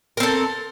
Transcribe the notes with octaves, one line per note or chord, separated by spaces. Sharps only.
C4 A4 A#4